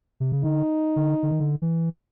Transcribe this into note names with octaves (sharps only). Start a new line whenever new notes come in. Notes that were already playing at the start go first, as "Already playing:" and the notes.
C3
C#3
D3 D#4
D3
D3
D#3
D3
E3